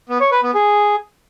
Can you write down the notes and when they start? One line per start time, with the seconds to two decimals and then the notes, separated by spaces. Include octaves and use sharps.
0.09 B3
0.20 C#5
0.32 B4
0.43 B3
0.54 G#4